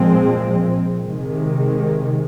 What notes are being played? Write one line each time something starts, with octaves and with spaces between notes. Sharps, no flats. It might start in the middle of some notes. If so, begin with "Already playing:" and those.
Already playing: A#2 F3 G#3 C4
C3 D#3 G#3